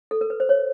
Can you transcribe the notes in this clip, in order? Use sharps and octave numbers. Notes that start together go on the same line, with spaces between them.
A4
A#4
B4
C5
C#5